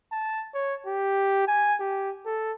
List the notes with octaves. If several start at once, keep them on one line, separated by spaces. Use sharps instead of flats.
A5
C#5
G4
G#5
G4
A4